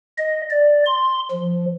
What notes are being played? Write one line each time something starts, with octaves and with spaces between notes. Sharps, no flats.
D#5
D5
C6
F3